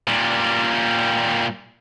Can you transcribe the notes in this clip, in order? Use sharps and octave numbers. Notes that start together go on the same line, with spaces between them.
A#2 G3